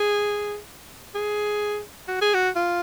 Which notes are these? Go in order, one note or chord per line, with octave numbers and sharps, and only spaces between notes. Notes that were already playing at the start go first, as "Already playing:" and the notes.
Already playing: G#4
G#4
F#4
G#4
F#4
F4